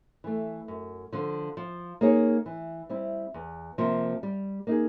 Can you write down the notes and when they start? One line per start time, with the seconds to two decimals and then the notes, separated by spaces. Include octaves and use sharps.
0.24 E3 A3
0.68 F#2
1.12 D3 F3
1.57 F3
2.01 A#3 D#4 G#4 C#5
2.46 E3
2.89 G3 C4 E4
3.34 E2
3.78 C3 F3 A#3
4.23 G3
4.67 A#3 D#4 G#4